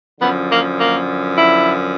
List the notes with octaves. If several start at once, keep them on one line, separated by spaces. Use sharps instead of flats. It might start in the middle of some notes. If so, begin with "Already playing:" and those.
F#2 D3 F3 B3
A#3
A#3
E4